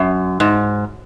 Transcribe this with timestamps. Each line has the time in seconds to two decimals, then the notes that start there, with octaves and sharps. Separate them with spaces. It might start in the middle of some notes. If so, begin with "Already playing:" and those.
Already playing: F#2
0.40 G#2